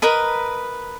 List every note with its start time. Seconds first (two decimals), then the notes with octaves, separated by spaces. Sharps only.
0.02 A#4 B4 D#5 B5